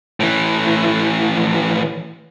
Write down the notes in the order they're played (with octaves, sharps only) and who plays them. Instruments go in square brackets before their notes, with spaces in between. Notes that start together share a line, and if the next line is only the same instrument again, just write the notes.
[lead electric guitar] A2 E3